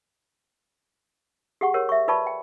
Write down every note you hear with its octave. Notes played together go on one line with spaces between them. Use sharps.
G4 G#4 F#5 C#6
G4 A#4 C#5
E5 C#6
F4 B4 D5 A5 B5 C#6
G5